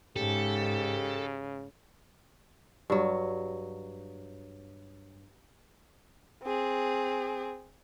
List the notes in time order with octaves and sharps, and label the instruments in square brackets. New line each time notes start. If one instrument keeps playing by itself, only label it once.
[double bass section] G#2 [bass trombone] C#3 [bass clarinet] G4 [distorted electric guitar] A4
[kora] G2 F#3
[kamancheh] C4 G#4